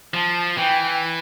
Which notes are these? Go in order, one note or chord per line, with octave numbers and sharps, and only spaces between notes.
F3 A5
E3 G5